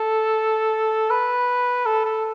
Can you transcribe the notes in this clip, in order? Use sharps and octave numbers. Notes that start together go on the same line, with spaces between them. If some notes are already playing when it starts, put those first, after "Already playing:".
Already playing: A4
B4
A4
A4